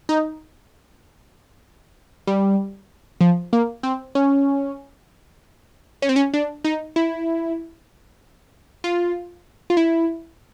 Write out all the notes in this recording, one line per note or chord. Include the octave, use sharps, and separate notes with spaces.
D#4
G3
F3
A#3
C4
C#4
C#4
C4
C#4
D4
D#4
E4
F4
F4
E4